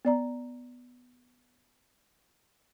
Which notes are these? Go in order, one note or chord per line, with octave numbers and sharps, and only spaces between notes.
B3 D5 A#5